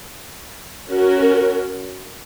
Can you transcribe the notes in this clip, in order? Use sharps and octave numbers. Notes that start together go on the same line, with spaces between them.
C#4 F#4 A#4